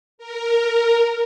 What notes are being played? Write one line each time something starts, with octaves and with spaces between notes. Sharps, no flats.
A#4